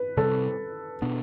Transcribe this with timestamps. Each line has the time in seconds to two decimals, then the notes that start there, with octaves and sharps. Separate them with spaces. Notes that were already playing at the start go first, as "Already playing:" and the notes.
Already playing: B4
0.17 C3 G3 C4 A4
1.02 B2 B3 D4